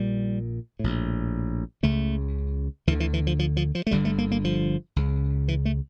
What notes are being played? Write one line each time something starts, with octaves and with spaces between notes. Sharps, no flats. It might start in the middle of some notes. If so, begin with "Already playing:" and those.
Already playing: A#1 A#2 G3
A#1 A2
C#2 C#3 A3
D2 D3 E3
E3
E3
F3
F3
F3
F3
A3
G1 G2 D3 G3
A3
A#3
A#3
F3
C#2 C#3
E3
A3